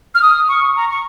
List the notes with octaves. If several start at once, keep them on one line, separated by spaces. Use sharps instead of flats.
F6
D#6
C#6
A#5
C#6